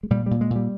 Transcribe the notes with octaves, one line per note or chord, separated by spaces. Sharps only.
G#3
A#2 G3
A#2 G3
G#3
A#2
G3